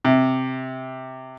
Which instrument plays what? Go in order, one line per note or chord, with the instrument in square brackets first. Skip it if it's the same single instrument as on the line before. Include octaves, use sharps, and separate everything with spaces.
[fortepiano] C3